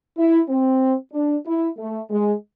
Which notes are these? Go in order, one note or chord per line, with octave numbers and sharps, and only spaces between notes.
E4
C4
D4
E4
A3
G#3